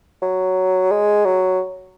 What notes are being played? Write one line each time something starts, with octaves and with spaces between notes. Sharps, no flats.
F#3
G#3
F#3